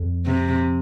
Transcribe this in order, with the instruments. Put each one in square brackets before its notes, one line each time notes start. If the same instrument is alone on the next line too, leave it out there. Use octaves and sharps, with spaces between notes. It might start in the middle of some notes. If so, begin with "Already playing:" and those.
Already playing: [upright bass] F2
[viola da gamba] C3